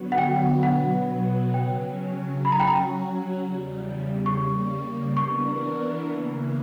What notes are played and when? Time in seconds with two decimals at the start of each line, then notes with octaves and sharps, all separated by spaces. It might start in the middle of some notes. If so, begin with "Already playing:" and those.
Already playing: D3 F#3 B3 F#4
0.12 F#5
0.18 G5
0.63 B2 F#3 B3 F#5
1.54 C#3 F#3 C#4 G5
2.45 F#3 C#4 F#4 B5
2.52 A#5
2.60 G5
2.67 A#5
3.36 E2 C#3 G3
4.26 C#3 G3 A#3 C#6
5.17 E3 B3 D4 A#4 C#6
6.08 C#3 E3 A#3